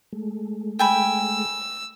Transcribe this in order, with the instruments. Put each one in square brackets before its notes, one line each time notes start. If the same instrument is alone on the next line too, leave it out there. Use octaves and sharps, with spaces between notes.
[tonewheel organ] G#3 A3
[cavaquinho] G5 G#5 B5 [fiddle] E6